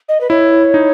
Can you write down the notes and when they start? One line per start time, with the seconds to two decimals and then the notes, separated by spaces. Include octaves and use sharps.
0.09 D#5
0.21 B4
0.30 E4 C#5
0.74 D#4